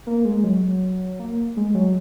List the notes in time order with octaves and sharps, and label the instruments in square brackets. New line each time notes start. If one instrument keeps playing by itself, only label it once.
[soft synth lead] A#3
G#3
F#3
A#3
G#3
F#3